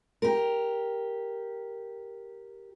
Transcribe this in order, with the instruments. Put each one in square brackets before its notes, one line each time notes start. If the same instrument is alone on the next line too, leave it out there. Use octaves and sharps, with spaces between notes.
[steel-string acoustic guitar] G4 A#4